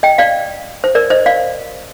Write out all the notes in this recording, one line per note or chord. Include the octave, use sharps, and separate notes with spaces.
D#5 G5
D5 F5
C5
A#4 D5
C5 D#5
D5 F5